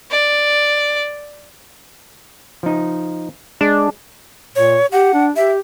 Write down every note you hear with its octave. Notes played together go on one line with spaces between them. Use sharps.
D5
F3 D#4
G#3 D4
A#2 C#5
G4 F#5
D4
G4 E5